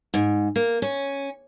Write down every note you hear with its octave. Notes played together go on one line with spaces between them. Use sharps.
G#2
A#3
C#4